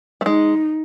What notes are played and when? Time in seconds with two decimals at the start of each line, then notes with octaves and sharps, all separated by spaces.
0.21 A3
0.25 G#3 D#4